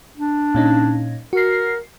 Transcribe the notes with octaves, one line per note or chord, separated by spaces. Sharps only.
D4
A#2 C#4 D#4
F#4 A#4 C7